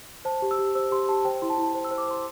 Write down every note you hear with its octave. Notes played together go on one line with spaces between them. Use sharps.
C5 A5
G4
E6
G4
C5 E6
G4 C6
G4 A5
C5 G5
E4 C6
A5
E4
C5
E6
C5
D6
C5 C6